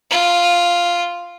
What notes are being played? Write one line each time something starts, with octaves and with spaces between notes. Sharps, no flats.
F4